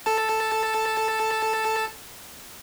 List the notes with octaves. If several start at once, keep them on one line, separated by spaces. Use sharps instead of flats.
A4 A5